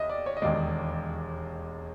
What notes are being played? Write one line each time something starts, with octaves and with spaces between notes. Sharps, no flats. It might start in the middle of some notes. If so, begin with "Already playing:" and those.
Already playing: D#2 D#5 E5
D5
C#5
D#5
E1 D#2 D#3 G#3 D5